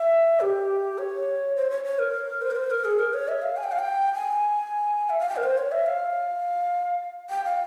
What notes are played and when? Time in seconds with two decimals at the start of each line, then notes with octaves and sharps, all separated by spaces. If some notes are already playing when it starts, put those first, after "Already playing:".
Already playing: E5
0.41 G4
0.98 C#5
1.56 C5
1.70 C#5
1.84 C#5
1.99 A#4
2.42 C5
2.51 A#4
2.56 C5
2.71 A#4
2.85 G#4
2.99 A#4
3.14 C#5
3.28 E5
3.42 F5
3.57 G#5
3.64 G5
3.72 F5
3.79 G5
4.14 G#5
5.10 E5
5.19 F5
5.29 G5
5.36 A#4
5.44 C5
5.58 C#5
5.72 E5
5.86 F5
7.30 G5
7.44 F5